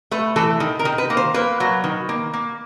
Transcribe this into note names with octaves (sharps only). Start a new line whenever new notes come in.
A3 B4
E3 A4
D#3
A#4
D#3
B4
A#3
C5
A#3 B4
F#3
D#3
A#3
A#3